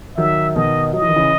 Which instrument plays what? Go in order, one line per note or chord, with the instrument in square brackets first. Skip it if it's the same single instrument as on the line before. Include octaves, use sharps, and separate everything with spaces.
[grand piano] D#3 F#3 [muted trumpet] E5
[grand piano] B2 D#3 [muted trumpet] D#5
[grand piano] F#3 [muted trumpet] D#5
[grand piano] E3
D#3
C#3 E3